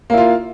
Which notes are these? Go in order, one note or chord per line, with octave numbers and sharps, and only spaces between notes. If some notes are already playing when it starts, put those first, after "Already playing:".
A#3 E4 F4